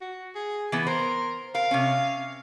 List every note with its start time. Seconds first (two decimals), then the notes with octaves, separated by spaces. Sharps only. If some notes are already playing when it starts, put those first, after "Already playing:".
0.01 F#4
0.35 G#4
0.72 E3 B3
0.87 A#4 C5
1.55 A#4 F5
1.71 C3 C#4